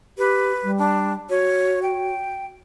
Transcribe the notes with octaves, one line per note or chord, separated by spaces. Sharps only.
G4 B4
G3
D4
F#4 C#5
G5